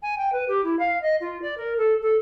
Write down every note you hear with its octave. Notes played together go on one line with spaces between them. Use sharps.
G#5
G5
B4
G4
E4
F5
D#5
F4
D5
A#4
A4
A4